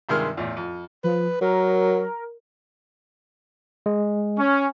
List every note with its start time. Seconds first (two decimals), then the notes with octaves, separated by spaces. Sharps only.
0.09 G2 C3 D#3 G#3 F6
0.37 A1 E2
0.56 F2
1.04 F3 B4
1.41 F#3 A#4
3.86 G#3
4.38 C#4